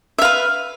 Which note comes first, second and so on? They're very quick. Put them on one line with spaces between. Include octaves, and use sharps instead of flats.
E5 F5 B4